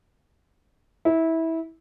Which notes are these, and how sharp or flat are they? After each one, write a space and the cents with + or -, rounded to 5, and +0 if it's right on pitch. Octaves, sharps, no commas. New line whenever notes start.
E4 -20